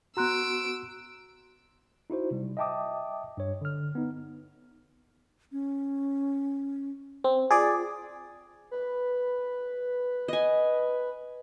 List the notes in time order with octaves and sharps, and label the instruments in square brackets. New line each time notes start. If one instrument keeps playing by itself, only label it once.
[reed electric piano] B3 F#4 [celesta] A#5 C6 F#6 [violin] E6 D7
[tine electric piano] D#4 E4 F#4 C5
C3 G3
D#5 E5 G5 A5 D6 D#6
G2 C#5
D3 F6
B3 D#4
[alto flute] C#4
[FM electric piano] C4
[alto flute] F4 [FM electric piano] G#4 D5
[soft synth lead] B4
[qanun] D#5 G#5